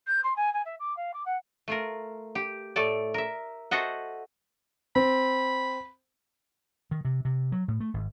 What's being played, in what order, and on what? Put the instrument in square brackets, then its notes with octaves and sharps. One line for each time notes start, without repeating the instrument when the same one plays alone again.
[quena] G6
C6
G#5
G#5
E5
D6
F5
D6
F#5
[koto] A3 F4 A#4
G4
A2 A3 A4 D5
A#4 E5
F#4 A4 C5 D#5 E5 F#5
[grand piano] C4 [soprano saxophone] B5
[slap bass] D#3
C3
C3
F#3
A2
A3
G#1